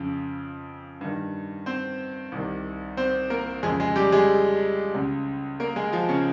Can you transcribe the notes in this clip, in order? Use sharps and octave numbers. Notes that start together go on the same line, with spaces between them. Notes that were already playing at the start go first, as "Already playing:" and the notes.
Already playing: F2 C#3
G2 D#3
C4 C5
C2 C3 D#3
C4 C5
A#3 A#4
F2 C#3 G#3 G#4
G#3 G#4
G3 G4
G#3 G#4
C#2 C#3
A#3 A#4
G#3 G#4
F3 F4
C#3 C#4